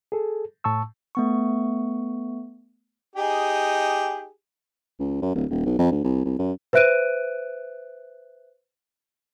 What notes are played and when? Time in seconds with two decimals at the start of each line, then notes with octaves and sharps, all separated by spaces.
0.12 G#4 A4
0.64 A2 A5 C#6 E6
1.15 A3 B3 C#6
3.16 D#4 G4 G#4
5.00 C#2
5.22 F#2
5.35 D1
5.50 D#1
5.66 B1
5.79 F2
5.91 D2
6.04 C2
6.25 C2
6.39 F#2
6.73 B4 C5 E5 F#6 D7 D#7